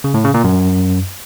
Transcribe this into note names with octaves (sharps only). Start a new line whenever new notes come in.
C#3
A2
C#3
A#2
F#2